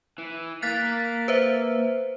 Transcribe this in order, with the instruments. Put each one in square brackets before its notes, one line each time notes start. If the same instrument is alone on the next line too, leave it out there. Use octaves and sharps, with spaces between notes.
[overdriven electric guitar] E3
[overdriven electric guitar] A#3 F5 [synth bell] F#6 A6 B6
[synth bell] B4 C5 E5